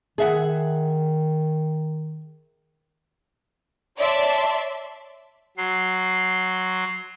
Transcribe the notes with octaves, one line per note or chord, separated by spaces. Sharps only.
D#3 G#4 E5 F#5
C#5 D5 E5 A5 C6
F#3 C6